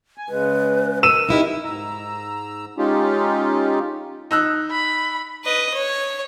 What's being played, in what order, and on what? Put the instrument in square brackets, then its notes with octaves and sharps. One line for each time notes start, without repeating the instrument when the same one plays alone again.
[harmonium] G#5
[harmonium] C#3 G#3 [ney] B4
[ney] A#4 [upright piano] E6 D#7 E7
[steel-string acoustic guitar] D#4 E4 G4
[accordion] G#2 A#5 E6
G#3 C#4 D#4 F4 G4
[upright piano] D#4 E6 F#6
[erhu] B5
[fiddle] B4 D#5
C#5